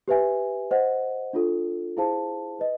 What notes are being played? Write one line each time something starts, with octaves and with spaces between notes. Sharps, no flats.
G4 B4 E5 G#5
C5 D#5 F#5
D4 F4 A4
E4 G#4 C5 F5 A5
B4 D#5